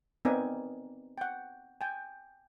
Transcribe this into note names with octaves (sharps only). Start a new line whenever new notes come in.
B3 C4 D#4 A#4 D5 G#5
F#5 G5
G5 G#5